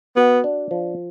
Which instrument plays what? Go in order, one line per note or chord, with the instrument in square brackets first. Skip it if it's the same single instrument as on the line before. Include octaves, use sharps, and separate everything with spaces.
[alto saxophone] B3 [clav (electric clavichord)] F#4
[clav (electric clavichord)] D4
F3